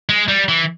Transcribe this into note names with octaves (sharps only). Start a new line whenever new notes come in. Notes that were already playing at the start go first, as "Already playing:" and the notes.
G#3
G3
E3